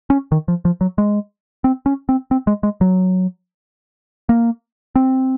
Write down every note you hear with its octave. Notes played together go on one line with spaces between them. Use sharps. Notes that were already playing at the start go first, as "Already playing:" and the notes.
C#4
D#3
F3
F3
F#3
G#3
C4
C#4
C4
C4
G#3
G#3
F#3
A#3
C4